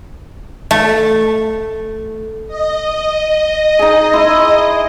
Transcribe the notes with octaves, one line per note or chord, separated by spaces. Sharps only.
A3
D#5
D#4 G#4
E4 C6